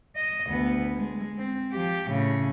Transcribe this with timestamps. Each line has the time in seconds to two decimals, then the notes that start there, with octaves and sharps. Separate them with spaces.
0.16 D#5
0.48 D2 B3
0.96 G#3
1.38 C4
1.72 F3 G4
2.09 A2 C#3